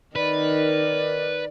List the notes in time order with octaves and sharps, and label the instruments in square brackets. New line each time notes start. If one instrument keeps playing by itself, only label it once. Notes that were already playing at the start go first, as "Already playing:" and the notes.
[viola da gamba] D#3 D#4 A#4 [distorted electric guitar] B4 [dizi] D5